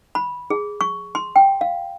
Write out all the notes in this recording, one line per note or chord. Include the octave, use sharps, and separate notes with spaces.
B5
G#4
C#6
C6
G5
F5